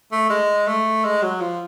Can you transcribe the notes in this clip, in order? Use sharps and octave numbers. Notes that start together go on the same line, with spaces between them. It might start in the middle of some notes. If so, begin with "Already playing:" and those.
A3
G#3
A3
G#3
F#3
F3